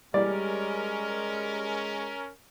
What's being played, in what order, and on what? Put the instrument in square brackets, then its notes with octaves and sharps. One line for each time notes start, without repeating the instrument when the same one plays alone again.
[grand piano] G3 [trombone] G#3 [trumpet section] C#4 A#4 [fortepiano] D5